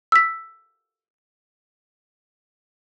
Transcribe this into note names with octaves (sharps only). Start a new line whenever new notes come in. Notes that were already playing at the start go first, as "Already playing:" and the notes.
E6 B6